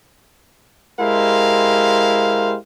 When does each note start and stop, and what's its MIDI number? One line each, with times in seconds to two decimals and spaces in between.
1.00 2.56 56
1.00 2.56 64
1.00 2.56 67
1.00 2.56 70
1.00 2.56 72
1.00 2.56 77